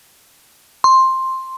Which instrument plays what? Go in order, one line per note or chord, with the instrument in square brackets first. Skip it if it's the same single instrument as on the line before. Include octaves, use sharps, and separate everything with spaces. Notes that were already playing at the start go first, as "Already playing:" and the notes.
[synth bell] C6